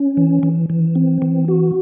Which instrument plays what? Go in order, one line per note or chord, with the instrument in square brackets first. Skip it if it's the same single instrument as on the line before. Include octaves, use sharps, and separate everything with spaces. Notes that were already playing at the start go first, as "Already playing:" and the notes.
Already playing: [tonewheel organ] C#4
E3
E3
E3
C4
E3
F#4